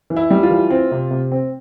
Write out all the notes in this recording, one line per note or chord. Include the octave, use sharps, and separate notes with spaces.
E3
E4
G3
F4
E3
C4
C3
C3
C4